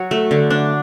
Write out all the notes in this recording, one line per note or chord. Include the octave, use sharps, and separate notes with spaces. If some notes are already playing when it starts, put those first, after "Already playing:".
Already playing: F#3 F#4
A3
D3
D4